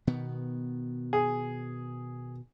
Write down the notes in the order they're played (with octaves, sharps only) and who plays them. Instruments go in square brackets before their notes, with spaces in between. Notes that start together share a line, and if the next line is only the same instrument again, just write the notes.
[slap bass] B2 D#3 B3
[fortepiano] G#4